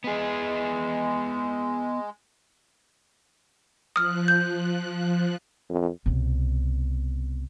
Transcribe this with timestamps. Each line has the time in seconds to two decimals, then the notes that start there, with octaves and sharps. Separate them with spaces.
0.04 G#3 B3 G#4
3.96 F3 D#6 F6 F#6
4.28 G6
5.70 F2
6.06 C2 B2